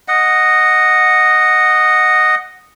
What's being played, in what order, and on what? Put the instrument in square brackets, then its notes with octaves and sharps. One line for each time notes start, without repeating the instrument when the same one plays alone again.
[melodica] D#5 F#5